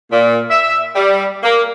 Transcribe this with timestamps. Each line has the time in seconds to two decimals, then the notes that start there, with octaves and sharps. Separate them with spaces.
0.12 A#2
0.50 E5
0.95 G3
1.43 A#3